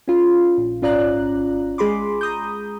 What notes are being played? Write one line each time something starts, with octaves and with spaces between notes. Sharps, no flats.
C#4 F4
A#1
G#1 C#4 F4 D5 A#5 F#6
G#3 G#4 B5 C6 D6
A#5 D#6 G6